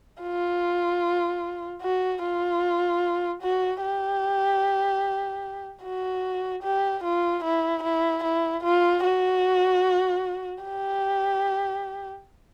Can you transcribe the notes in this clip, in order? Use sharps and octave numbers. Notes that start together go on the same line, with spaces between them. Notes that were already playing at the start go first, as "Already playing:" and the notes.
F4
F#4
F4
F#4
G4
F#4
G4
F4
E4
E4
E4
F4
F#4
G4